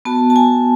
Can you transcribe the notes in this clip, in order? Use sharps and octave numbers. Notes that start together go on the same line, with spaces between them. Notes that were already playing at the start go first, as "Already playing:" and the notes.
B3 F#4 A5
A5
G#5